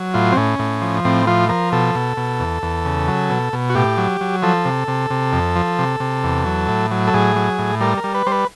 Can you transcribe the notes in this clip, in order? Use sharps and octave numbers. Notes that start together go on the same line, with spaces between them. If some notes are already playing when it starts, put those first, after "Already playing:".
Already playing: F#3
A2 F4
C4
A2 C#4
A2
F3
A2 C4
F3 F4
F3 A#4
B2 A4
B2
B2
E2
E2
C#3
F#3
B2
B2
F#4
A2 G4
F#3
F#3
F3 A4
C3
C3
C3
F2
F3
C3
C3
E2
F#3
A2
F#3
A4
A2 G#4
F#3
A2
G3 A#4
A#4
G3
B4
G3 C5
B4